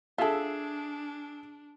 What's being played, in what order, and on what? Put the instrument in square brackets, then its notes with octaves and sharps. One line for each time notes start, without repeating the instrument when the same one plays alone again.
[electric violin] D4 [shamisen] F4 A4 [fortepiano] G#4 E5